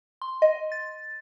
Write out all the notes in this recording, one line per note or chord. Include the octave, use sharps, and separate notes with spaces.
C6
D#5
A6